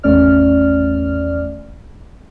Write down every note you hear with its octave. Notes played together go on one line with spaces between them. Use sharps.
G#1 E2 A3 C#4 D5 F6